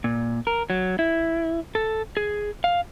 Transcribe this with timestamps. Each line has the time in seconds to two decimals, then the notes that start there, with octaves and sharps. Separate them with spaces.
0.04 A#2
0.47 A#4
0.70 F#3
0.99 E4
1.75 A4
2.17 G#4
2.64 F5